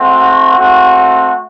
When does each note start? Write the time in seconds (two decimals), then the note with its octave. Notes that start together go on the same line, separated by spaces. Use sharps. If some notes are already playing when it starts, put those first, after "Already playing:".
Already playing: A3 C4 F#4
0.57 A3 C4 F#4